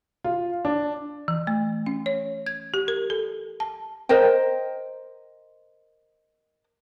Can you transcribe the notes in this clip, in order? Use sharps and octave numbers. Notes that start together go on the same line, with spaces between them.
F4
D4
E3
A3
C#4
C#5
G#6
G4
A#4
A4
A5
A#4 C5 D#5 G5